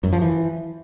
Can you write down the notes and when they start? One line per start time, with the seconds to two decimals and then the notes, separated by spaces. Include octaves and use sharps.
0.03 F#2
0.13 F3
0.22 E3